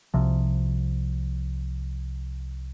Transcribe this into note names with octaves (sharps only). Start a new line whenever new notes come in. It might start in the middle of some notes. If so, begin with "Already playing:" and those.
C2 C3 F3